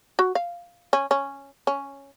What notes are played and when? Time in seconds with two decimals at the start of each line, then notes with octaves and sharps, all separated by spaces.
0.19 F#4
0.35 F5
0.93 C#4
1.11 C#4
1.67 C#4